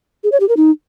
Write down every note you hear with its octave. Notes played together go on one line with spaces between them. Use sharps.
G#4
C#5
G4
A#4
D#4